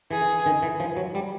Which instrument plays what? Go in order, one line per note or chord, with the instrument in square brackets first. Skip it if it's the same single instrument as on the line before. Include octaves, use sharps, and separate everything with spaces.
[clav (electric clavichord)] E3 [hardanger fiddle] G#4
[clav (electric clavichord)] D#3
E3
F3
F#3
G3